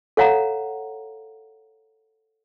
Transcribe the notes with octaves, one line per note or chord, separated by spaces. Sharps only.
A4 C#5 F5 F#5 A#5